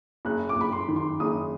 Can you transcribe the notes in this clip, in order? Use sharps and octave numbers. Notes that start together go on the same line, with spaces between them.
F#1 F#6
D6
F#1 B5
C6
D#3
C6
F#1 D#6